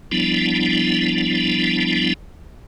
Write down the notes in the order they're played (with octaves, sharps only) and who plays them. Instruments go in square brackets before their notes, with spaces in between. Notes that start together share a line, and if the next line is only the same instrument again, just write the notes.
[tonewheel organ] F3 G3 B3 D4 E4